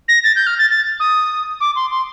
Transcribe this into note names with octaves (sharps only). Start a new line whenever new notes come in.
A#6
A6
G6
F6
A6
A6
D#6
D6
C6
C6